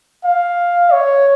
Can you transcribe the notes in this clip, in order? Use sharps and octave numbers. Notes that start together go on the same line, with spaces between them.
F5
C#5